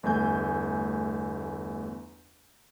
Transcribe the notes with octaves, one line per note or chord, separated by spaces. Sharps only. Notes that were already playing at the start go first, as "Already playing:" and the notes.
G1 E2 A3 G#5 G6